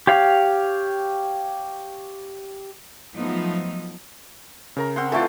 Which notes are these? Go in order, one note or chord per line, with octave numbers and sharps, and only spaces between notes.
G4 C#5 F5
F3 F#3 A3 B3 D#4
C#3 A#4 A#5
C4 F#5 C6
E3 A3 F4 A4 D5